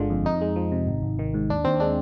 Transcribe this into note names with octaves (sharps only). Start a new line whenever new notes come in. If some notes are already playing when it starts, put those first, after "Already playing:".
Already playing: G1 D3 G#3 F4
F2
F2 D#4
G#3
F3
C3
G#1
G#1
D#3
G#2
D#2 D4
D#2 C4
G#3 D4